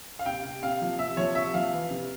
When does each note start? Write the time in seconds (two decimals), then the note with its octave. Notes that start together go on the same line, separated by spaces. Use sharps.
0.19 F5
0.26 C3 G5
0.45 C3
0.63 C3 F5
0.82 F3
0.99 C3 E5
1.17 F3 C#5
1.35 C3 E5
1.54 F3 F5
1.73 E3
1.91 C3